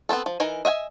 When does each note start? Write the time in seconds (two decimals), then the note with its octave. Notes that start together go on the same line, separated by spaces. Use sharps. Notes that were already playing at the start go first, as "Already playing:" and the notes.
0.09 B3 C4 F4 A4
0.26 F3
0.40 E3 D#4 A#4 G#5
0.65 D#5 E5 F#5 G#5